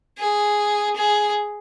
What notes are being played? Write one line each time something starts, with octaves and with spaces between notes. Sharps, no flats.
G#4
G#4